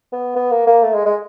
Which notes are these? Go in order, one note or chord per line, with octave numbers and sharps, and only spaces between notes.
B3
B3
A#3
A#3
A3
G#3
G#3